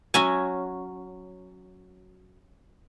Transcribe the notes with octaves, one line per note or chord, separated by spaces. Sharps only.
F#3 C#4 F#4 E5 G#5